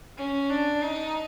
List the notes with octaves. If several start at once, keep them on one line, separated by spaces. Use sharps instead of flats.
C#4
D4
D#4